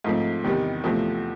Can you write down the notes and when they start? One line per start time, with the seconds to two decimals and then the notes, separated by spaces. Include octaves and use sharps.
0.04 G#2 F3 A3 C4
0.44 E2 C3 D#3 G3
0.84 E2 C3 F3 A3 C4